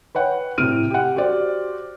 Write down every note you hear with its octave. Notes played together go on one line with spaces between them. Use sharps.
B4 C#5 F#5 G5
A2 C3 F6 D7 D#7
G4 F#5
F#4 G4 C5 D5